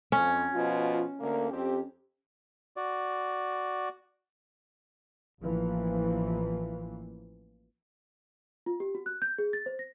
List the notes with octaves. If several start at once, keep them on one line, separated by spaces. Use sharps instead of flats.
F2 C#4
B2 F3 F4
D2 D3 A#3
F2 C4 G4
F#4 D5
A1 E3 F3 A#3
F4
G4
F#4
F#6
G6
G#4
A6
C5
A#6